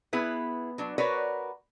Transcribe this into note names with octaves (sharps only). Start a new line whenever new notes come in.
B3 E4 G#4 B4
F#3 D4
F#4 A#4 B4 C#5 D5